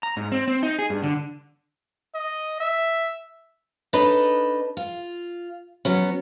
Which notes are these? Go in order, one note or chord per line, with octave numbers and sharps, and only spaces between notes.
A#5
G#2
C4
C4
D#4
G#4
G2
D3
D#5
E5
D4 D#4 A4 B4 C#5 D#5
F4
F#3 B3 C#4